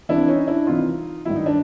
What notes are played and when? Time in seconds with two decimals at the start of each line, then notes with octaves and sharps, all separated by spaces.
0.09 C2 C3 E3 D4 E4
0.28 C#4 D#4
0.47 D4 E4
0.67 C2 C3 E3 D#4 F4
1.25 G2 D#3 F#3 E4
1.36 D#4
1.46 D4